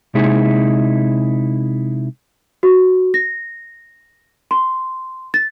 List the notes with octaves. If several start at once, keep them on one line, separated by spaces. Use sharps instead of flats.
C3 G#3 D#4 E4 G#4
F#4
A#6
C6
A6